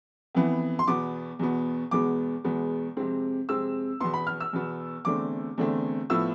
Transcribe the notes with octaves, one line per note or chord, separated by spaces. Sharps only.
F2 E3 B3
C6
E2 B2 B3 D6
E2 B2 B3
E2 B2 G#3 B3 D6
E2 B2 G#3 B3
F2 C3 G#3 C4
F2 C3 G#3 C4 E6
E2 B2 B3 C6
B5
F6
E6
E2 B2 B3
E2 D3 A3 C4 D6
E2 D3 A3 C4
A2 F3 B3 E6